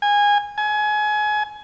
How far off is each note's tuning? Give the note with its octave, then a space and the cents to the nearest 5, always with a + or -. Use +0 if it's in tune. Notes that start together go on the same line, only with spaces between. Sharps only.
G#5 -20
G#5 +25